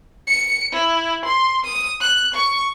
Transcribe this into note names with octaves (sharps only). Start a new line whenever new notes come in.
C#7
E4
C6
D#6
F#6
C#6